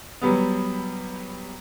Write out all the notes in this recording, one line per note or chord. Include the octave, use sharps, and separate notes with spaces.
F#3 G3 B3